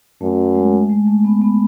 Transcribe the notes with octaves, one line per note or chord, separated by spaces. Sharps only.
F#2 A3
G#3
G#3
A3
B3
B3